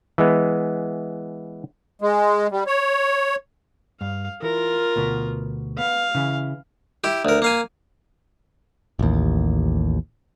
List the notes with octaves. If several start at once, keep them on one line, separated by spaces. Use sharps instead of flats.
E3 G#3 B3
G#3
G3
C#5
G2 F5
E3 F4 A#4
D2 B2 B3
B3 F5
C#3 E3 E4
E4 G4
D2 A#4
A#3 F5 G#5
A1 D#2